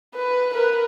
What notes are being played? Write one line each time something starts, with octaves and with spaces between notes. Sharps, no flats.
B4
A#4 B4